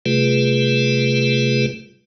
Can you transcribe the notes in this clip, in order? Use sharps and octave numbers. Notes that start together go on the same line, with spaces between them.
C3 G3 A3 F4 G#4 B4